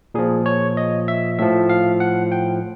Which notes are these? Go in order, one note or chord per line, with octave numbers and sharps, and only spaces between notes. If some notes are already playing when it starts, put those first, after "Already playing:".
A#2 F3 G#4
C#5
D#5
E5
A2 F3 E5
F5
F#5
G5